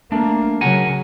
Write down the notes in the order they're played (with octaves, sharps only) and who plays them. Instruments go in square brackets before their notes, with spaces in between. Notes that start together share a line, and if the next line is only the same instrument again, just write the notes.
[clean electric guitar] A3 D4 [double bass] A#3
[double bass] C#3 F#3 [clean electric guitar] A#4 F#5 G#5